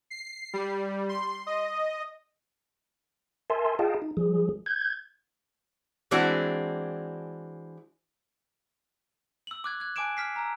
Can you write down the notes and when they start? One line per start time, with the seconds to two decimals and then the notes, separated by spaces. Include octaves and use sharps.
0.10 C7
0.53 G3
1.09 C6
1.47 D#5
3.50 A#4 E5 G#5 A5 C6
3.79 F4 G#4 D#5 F5 G5 A5
4.02 D#4
4.17 F3 G3 G#4
4.66 G6 G#6
6.11 E3 G#3 C4 D4 E4 F#4
9.47 E6 F#7
9.64 D6 F#6 G#6
9.80 F#6 G#6
9.96 G#5 A5 D6 F#6 D7 E7
10.17 F6 B6 C7
10.36 A#5 E6